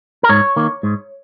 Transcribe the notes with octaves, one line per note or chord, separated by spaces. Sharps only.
A#4
G#2 C#5
D#3 A#3
G#2